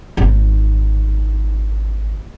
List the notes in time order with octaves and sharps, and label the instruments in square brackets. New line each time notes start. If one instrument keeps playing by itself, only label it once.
[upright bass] G#1 D#4